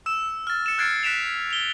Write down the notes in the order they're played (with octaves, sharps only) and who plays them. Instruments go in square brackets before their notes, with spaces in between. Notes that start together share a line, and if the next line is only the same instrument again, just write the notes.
[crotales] E6 E7
F6 A6
C#7 E7
F6 F#6 G#6 A6 C7 D7
F#6 B6 D7 E7 F7
F7 G7